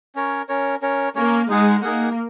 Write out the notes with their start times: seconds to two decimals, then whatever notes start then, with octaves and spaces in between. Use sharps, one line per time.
0.15 C#4 A#4 C#5
0.49 C#4 A#4 C#5
0.82 C#4 A#4 C#5
1.15 A#3 C#4 A#4 C#5
1.49 G#3 D#4 G#4 F#5
1.82 A#3 D#4 G#4 F#5